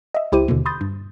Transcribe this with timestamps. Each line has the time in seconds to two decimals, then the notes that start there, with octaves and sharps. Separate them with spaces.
0.14 D#5 E5
0.32 C#2 E4 G4 C5 D#7
0.48 D#2 B2 D3
0.66 B5 C6 D#6 G6 A6
0.81 G2